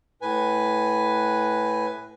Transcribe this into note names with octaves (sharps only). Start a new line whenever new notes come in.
A2 B4 G#5